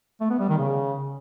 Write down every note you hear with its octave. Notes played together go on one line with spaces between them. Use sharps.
A3
B3
G3
D#3
C#3